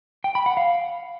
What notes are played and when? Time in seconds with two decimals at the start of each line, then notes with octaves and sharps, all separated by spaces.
0.24 G5
0.35 B5
0.46 F#5
0.57 F5